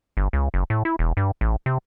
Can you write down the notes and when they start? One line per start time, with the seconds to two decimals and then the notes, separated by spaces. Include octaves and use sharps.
0.17 G1
0.33 C#2
0.54 F#1
0.70 A2
0.85 E4
0.99 E1
1.17 G2
1.41 A1
1.66 C3